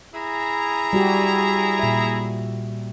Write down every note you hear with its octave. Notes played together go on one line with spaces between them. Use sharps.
E4 G#4 A#5
G3 F#4 G4
A#2 E5